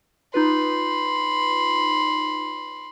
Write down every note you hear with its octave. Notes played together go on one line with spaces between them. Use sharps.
D#4 F4 B4 B5 C6